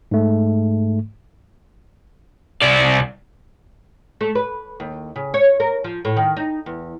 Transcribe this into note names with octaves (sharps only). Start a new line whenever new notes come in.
G#2 A3
C2 D5
A3
B4
D#2
C#3
C#5
A#4
F3
A2
D#3
D#4
E2